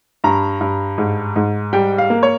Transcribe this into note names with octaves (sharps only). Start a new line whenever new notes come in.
G2 A#5
G2
G#2
G#2
G3 G5
F5
A#3
C#5